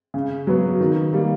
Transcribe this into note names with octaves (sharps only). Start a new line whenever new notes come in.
C#3
F#3 B3
D#3
G3 A#3